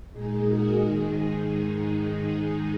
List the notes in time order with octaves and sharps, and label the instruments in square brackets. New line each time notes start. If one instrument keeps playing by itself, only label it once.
[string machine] A#2 G#3 D#4 G#4
F#4 A#4
G#2 D#3 G#3 D#4 G#4